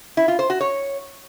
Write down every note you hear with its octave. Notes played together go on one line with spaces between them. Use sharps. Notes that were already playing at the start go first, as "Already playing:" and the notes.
E4
F4
C5
F#4
C#5